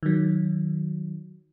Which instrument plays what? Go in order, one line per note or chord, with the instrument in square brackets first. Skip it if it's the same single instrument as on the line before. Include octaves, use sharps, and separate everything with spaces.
[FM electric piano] D#3 F#3